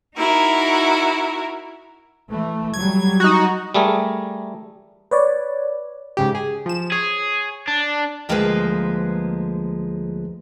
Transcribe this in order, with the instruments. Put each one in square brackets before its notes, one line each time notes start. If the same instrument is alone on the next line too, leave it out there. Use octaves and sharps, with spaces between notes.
[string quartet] D#4 E4 F#4 A#4
[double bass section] E3 A3
[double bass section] F#3 G3 [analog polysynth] G#6
[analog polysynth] D#4 F#4
[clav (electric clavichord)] G3 A3 G#4 A#4
[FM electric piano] B4 C#5 D5
[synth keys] G#2 C#3 G4
G#4
F3 E7
[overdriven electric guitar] G#4 [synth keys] C#5
[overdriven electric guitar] D4
[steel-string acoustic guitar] D2 F3 G#3 A#3 B4 C5